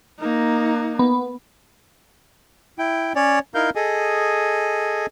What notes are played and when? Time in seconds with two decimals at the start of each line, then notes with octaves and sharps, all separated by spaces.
0.20 A#3 D#4
0.99 B3
2.79 E4 G5
3.15 C#4 C#5 D5
3.55 D#4 E4 A#4 F5 G6
3.76 G#4 A4 D#5 G#5